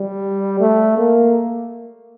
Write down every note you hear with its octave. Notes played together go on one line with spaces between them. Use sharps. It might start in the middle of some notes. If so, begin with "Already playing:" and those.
Already playing: G3
A3
A#3